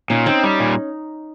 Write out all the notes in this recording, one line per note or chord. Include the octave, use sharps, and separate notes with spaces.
A#2 C#4 D#4
C4 C#4 D#4
G3
A#2